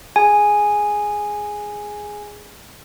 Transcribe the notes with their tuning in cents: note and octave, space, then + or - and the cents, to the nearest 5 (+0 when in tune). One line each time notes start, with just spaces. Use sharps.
G#4 +0 G#5 +0